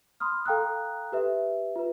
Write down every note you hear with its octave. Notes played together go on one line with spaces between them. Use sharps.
B5 C6 D#6 F6
A4 F5 G5 A#5 D#6 F#6
G4 B4 E5
F4 B4